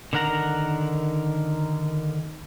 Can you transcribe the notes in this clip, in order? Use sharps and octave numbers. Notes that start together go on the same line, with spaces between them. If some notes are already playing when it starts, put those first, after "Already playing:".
D3 D#3 A#4 F#5 A#5